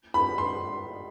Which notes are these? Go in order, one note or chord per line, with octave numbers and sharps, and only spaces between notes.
B5
C6